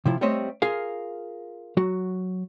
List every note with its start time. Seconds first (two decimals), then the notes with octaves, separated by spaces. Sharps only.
0.06 C3 F3 E4
0.21 G3 A3 C4 C#5 D#5 E5
0.62 F4 G#4 A#4 F5
1.77 F#3 F#4